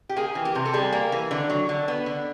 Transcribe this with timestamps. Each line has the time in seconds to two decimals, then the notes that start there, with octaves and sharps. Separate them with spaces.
0.09 G4
0.16 A#3 G#4
0.35 E3
0.45 G4
0.55 C3
0.66 A4
0.74 G3 G#4
0.92 A#3
1.12 E3
1.31 D3
1.50 F#3
1.69 D3
1.88 B3
2.06 D3